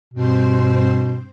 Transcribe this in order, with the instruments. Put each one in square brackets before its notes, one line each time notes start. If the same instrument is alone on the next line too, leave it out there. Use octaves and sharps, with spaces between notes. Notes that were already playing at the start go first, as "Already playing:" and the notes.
[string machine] G2 C4 C5 [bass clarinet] B2